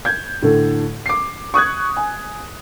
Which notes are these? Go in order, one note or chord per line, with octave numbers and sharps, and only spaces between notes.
G6 G#6
A2 D3 A4
D6 C7
C#6 D#6 F#6 G#6
G#5